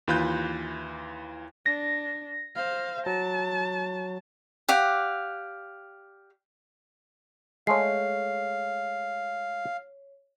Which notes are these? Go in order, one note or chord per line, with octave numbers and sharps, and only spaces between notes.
D#2 E3 F4 B5 F#6 G6
D4 A#6
C5 F5
F#3 A5
G4 D5 F5 F#5
G#3 A3 C#5 F5 C7